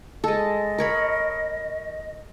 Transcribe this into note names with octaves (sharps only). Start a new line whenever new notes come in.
G#3 A4 D#5
A#4 C#5 B5